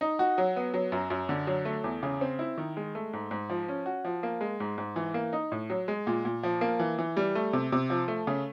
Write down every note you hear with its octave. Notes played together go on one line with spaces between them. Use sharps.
D#4
F#4
F#3
B3
F#3
F#2
F#2
D3
F#3
A3
E2
C#3
C4
E4
D#3
G#3
A3
G#2
G#2
F3
C#4
F#4
F3
A#3
G#3
G#2
G#2
E3
A#3
D#4
A2
F#3
G#3
A#2
A#2
F3
A#3
E3
E3
G3
A3
C3
C3
F3
A3
C#3